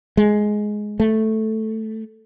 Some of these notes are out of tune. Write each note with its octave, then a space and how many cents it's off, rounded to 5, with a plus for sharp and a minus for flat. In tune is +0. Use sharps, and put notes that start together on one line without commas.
G#3 +10
A3 +0